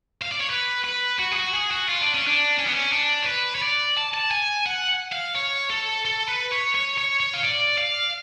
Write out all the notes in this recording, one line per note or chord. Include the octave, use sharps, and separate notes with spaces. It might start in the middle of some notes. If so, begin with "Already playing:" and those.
F5
D5
C#5
B4
B4
F#4
G#4
F#4
G#4
F#4
F4
D4
C#4
D4
C#4
B3
C#4
D4
C#5
B4
C#5
D5
A5
A5
G#5
F#5
F5
C#5
A4
A4
B4
C#5
C#5
C#5
C#5
F5
D5
F5